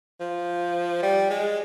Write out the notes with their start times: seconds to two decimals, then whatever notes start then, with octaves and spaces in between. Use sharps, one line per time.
0.20 F3
1.03 G3
1.30 G#3